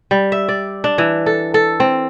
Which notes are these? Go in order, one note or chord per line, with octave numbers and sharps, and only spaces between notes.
G3
E5
D5
D4
E3
A4
A4
C4